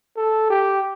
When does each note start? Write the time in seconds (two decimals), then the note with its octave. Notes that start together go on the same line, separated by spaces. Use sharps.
0.17 A4
0.50 G4